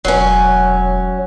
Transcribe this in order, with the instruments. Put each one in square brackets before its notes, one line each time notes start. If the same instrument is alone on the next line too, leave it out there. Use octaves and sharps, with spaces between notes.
[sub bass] E1 [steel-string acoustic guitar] F#3 C#4